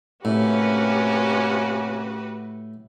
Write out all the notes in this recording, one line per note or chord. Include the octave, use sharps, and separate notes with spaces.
A2 C3 A#3 C#4 F#4 G4 B4